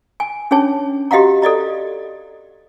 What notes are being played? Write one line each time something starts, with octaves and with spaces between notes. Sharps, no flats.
G#5
C#4 D4 G#4 C#5 A5
F#4 G4 D#5 F5 F#5 A#5
A4 D5 D#5 A#5